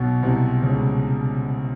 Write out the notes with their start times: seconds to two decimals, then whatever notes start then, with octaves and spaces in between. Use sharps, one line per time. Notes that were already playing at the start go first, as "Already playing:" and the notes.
Already playing: B1 B2
0.23 C2 C3
0.63 C#2 C#3